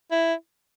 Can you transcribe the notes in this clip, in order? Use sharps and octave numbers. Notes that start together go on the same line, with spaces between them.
E4